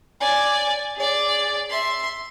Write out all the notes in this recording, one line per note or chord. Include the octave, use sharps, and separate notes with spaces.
D5 G#5
G#4 D5
E5 C6